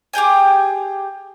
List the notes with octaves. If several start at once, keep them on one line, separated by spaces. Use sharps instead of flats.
G4 G#4 G5 G#5